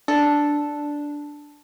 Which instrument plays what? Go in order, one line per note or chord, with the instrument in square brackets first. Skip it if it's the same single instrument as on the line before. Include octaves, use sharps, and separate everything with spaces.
[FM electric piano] D4 [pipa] A4